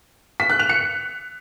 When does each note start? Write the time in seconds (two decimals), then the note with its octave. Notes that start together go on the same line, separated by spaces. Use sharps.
0.40 B6
0.50 F#6
0.60 F7
0.69 C#7